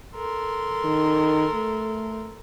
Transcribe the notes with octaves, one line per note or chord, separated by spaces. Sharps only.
A4 A#4 C6
D#3
A3